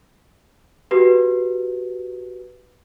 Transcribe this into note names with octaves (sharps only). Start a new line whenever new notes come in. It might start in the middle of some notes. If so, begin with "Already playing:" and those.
F#4 G4 B4